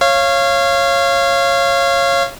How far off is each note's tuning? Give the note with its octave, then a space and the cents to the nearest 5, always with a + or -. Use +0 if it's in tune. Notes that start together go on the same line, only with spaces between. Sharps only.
C#5 -15 F5 -20